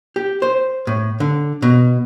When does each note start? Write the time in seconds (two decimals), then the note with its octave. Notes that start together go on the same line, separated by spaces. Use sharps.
0.16 G4
0.42 C5
0.87 A2
1.20 D3
1.62 B2